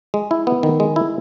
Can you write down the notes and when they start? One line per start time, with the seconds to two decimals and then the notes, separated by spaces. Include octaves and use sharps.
0.14 G#3
0.31 E4
0.47 B3
0.63 D#3
0.80 G#3
0.96 E4